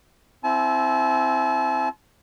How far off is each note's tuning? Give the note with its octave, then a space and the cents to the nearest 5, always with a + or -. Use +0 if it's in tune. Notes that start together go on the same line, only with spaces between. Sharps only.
C4 +0 E4 +0 A5 -45